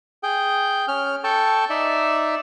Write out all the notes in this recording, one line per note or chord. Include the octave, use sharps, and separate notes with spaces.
G#4 G5
C#4 F6
A4 G5 A5 C#6
D#4 D5 E5